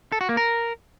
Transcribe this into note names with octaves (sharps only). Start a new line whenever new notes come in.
A4
F#4
A#3
A#4